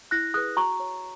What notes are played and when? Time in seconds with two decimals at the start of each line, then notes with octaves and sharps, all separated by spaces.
0.11 E4 F#6 A#6
0.34 G#4 B4 D#6 F#6
0.57 F#4 A#5 C#6
0.80 C#5